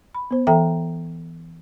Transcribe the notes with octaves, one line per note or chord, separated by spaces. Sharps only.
B5
B3 C5
E3 A4 E5 G5 A#5